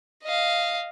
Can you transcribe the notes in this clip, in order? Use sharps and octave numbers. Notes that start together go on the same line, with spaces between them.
D#5 F5